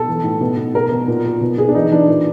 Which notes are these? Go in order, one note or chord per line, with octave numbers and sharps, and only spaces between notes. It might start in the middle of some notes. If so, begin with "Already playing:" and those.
Already playing: B2 A4
E3
A2
B2
B2
B2 A#4
B2
A#2
A#2
B2
B2 G#4
D4
E3 D#4
E3 D4
A#2